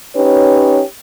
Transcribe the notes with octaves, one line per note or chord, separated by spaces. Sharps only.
C#4 D#4 G4 B4 C#5